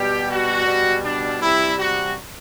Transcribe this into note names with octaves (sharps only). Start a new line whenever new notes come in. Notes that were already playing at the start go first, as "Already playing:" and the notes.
Already playing: B2 G3 G4
F#4
B2 G3
D4
C3 G3 E4
F#4